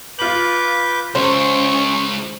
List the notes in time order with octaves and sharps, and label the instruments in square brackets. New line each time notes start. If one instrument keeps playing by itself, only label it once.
[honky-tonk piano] F4 F#7 [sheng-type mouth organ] B4 D6 G6
[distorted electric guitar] C#2 [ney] C#4 [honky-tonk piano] C5 [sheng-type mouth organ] C#6